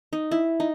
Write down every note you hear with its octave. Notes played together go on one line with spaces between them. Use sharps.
D#4
E4
D#4